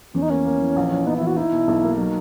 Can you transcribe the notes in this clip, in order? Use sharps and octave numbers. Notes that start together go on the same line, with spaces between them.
E2 C#4
D#4
A#3 C#4
A#3
E3
A#1
E3
B3 D#4
E4
E3
F#4
D#4 E4
B2
B1
A#3
F#3 D#4